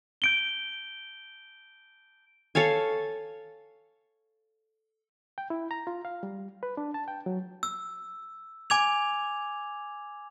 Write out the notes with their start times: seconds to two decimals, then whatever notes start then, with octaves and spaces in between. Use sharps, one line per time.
0.22 G6 D7 G7
2.55 A4 C#5 F5 G#5
5.38 G5
5.50 E4
5.71 A#5
5.87 F4
6.05 F5
6.23 G3
6.63 B4
6.77 D4
6.94 A5
7.08 G5
7.26 F#3
7.63 E6
8.70 G#5 D6 G#6 F7